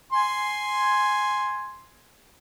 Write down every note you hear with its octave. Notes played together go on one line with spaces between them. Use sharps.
G#5 C6